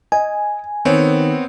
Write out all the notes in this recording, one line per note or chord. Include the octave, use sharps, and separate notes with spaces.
D#5 G#5
D#3 B3 C4 C#5